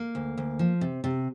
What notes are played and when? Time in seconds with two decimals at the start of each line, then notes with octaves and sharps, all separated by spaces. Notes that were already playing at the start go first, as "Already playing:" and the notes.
Already playing: A#3
0.15 D2
0.37 D2
0.59 F3
0.81 C3
1.04 C3